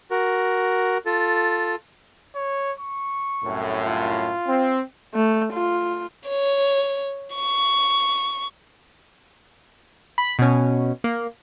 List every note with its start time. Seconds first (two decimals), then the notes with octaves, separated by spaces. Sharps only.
0.11 F#4 A#4
1.06 F4 A4
2.35 C#5
2.80 C#6
3.43 C2 F#2 A2
3.86 F4
4.47 C4
5.14 A3
5.53 F4
6.28 C#5
7.35 C#6
10.18 B5
10.39 B2 C#4
11.04 A#3